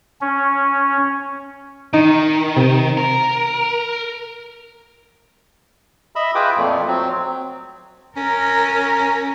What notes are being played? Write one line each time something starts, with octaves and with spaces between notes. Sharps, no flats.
C#4
D#3 D#4
C3
A#4
D#5 E5 B5 E6
F4 G#4 B4 G5 D6 D#6
F2 A#2 A3
F#3 C4
C#4 A#4